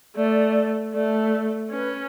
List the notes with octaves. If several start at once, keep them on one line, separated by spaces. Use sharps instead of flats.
A3 D5
A3 D5
C#4 B4